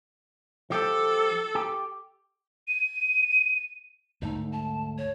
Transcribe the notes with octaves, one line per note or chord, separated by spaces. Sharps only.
F3 G4 A4
G4
D#7
D2 G#2 A3 D#4
A5
C#5